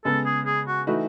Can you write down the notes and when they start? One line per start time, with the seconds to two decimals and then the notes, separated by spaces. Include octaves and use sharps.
0.05 C#3 G#3 B3 A4
0.26 G#4
0.46 G#4
0.67 F#4
0.87 E3 A3 D#4 F#4 B4